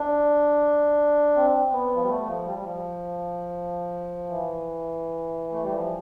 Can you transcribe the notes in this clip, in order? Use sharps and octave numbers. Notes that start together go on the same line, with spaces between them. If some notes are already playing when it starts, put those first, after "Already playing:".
Already playing: D4
C4
B3
F3
G3
A3
F3
G3
G3
F3
E3
A3
G3
F3